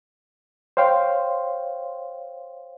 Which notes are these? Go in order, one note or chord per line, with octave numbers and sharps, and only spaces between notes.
C5 C#5 F5 G5 C6